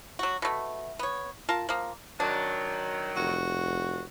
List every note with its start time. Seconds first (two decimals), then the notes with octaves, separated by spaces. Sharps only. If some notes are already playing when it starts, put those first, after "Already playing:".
0.19 F#3 F#4
0.42 B2 A3
0.99 B3 C#5
1.49 F4 A#4 A5
1.69 F3 A#3
2.20 D#3 F#3 D4
3.17 F1 F#4